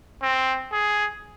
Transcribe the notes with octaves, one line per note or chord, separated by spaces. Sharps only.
C4
G#4